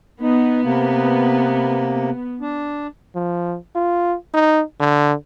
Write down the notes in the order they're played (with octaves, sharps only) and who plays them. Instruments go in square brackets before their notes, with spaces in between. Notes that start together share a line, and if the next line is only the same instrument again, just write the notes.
[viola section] B3 [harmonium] D#4
[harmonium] C3 A#3
D4
[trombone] F3
F4
D#4
D3